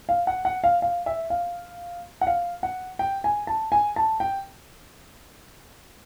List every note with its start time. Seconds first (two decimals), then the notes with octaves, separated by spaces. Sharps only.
0.09 F5
0.27 F#5
0.45 F#5
0.64 F5
0.82 F5
1.06 E5
1.30 F5
2.21 F#5
2.27 F5
2.63 F#5
2.99 G5
3.24 G#5
3.47 A5
3.72 G#5
3.96 A5
4.20 G5